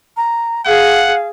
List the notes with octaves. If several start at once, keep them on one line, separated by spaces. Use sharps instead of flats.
A#5
G#4 F5 F#5